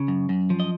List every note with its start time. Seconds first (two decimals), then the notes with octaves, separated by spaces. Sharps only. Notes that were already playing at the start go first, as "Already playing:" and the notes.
Already playing: C#3
0.08 F#2
0.29 F#2
0.50 F3
0.60 D#5